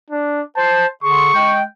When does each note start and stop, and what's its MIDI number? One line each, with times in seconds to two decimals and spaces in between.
0.11 0.41 62
0.57 0.86 72
0.57 0.87 81
1.04 1.31 50
1.04 1.31 68
1.04 1.31 84
1.04 1.56 85
1.34 1.62 56
1.34 1.62 79